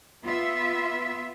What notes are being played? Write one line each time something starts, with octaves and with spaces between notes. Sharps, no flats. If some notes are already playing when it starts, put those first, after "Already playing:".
B3 F4 E5